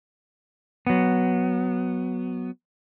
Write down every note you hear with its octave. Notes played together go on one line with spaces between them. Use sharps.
F#3 B3